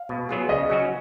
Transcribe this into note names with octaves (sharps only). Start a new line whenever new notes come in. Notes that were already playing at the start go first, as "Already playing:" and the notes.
Already playing: F5
B2
F#3 B3 F4 G#4
C#3 D#5
F#3 C#4 F#4